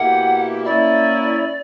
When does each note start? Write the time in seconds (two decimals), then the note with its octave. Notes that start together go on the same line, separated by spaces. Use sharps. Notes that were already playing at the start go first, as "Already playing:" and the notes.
Already playing: B2 A#3 E4 G4 F#5
0.65 A#3 C#4 E4 D5